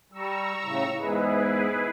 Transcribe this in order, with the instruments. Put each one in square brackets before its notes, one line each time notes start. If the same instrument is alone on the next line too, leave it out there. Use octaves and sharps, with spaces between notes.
[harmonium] G3 [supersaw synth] A#5 C#6 E6
[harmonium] A2 C#3
[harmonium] E2 G#2 [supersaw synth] E4 G#4 B4